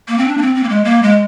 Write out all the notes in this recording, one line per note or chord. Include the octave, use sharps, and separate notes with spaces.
A#3
C4
D4
A#3
C4
C4
A#3
G#3
A#3
G#3